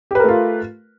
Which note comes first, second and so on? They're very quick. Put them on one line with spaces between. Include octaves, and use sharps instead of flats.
G4 B4 A#4 A3 F4